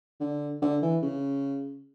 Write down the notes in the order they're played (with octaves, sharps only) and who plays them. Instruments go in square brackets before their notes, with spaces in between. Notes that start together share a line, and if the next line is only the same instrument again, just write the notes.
[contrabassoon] D3
D3
E3
C#3